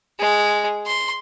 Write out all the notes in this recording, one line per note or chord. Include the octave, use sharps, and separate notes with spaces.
G#3
C6